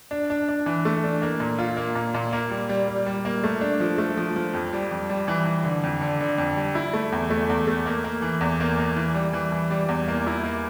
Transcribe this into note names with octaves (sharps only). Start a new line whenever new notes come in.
D4
D4
D4
E3
A3
D4
A#3
A#2
F4
A#3
A#2
A#2
A#3
G3
G3
G3
G3
A#3
A3
D4
F3
A3
F3
F3
F2
G3
F2
G3
E3
E3
D3
F2
D3
D3
F2
G3
E4
A3
E2
A3
E2
A3
A#3
A#3
E3
E2
A#3
A#3
E3
G3
E3
E3
G3
E2
A#3
E4
A#3